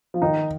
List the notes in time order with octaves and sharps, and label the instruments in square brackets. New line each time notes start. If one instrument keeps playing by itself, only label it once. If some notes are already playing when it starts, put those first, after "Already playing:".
[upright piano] F3
[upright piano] D#3 [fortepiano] D#4